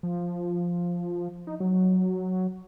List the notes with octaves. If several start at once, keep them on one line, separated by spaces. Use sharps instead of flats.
F3
D#4
F#3